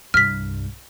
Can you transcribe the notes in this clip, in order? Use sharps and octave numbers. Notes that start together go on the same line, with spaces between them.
C2 G2 F6 B6